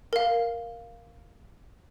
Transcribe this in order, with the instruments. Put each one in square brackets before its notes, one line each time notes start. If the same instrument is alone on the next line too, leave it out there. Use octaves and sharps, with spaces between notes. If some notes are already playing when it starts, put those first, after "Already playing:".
[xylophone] A#4 F5